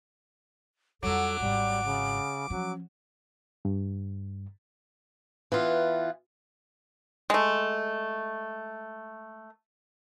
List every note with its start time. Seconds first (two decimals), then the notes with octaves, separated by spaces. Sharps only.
1.03 F2 F#3 G3 A4 D6
1.40 G#1 G#2 G3
1.85 C#3
2.50 F3 F#3 C#4
3.65 G2
5.52 E3 B3 F4
7.30 G#3 A3